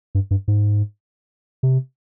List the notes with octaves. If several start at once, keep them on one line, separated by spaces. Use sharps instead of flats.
G2
G2
G#2
C3